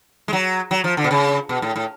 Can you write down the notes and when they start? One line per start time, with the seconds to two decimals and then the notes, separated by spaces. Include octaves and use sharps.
0.28 G#3
0.33 F#3
0.71 F#3
0.84 F3
0.97 D3
1.04 B2
1.11 C#3
1.49 B2
1.62 A2
1.76 A2